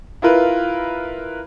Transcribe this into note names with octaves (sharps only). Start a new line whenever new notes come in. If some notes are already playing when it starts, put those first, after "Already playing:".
E4 F4 A#4 B4